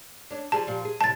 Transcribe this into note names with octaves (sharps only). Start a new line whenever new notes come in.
C#4 D4
F3 G3 G#4 A5
A#2 F3 G3
G#4
E2 A2 C3 A5 A6